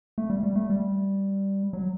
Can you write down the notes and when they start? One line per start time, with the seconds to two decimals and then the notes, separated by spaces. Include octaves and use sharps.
0.18 A3
0.30 G3
0.43 G3
0.55 A3
0.70 G3
1.73 F#3